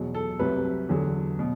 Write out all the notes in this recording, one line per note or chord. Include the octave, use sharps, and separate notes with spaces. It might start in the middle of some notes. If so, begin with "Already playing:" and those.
Already playing: E2 B2 F#3
A4
C2 C3 F#3 B4
E2 D3 F#3
B2